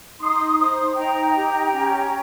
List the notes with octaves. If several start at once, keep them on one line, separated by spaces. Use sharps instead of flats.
D#4 C6 D#6
C5 C6 D#6
D#4 G5 A#5
G4
C#4